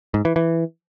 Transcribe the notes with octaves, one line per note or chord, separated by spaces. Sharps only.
G#2
E3
E3